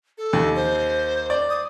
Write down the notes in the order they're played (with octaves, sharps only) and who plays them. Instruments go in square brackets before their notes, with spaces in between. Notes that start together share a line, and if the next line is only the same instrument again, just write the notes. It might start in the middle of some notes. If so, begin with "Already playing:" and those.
[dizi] A4
[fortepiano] D#2
[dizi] C5
[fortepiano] D5
[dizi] D#6